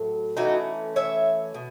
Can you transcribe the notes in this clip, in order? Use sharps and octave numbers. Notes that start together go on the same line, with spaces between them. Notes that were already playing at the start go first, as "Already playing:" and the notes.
Already playing: A2 F#3
E3 A3 C#4 D#4 F#4
C#5 E5
B2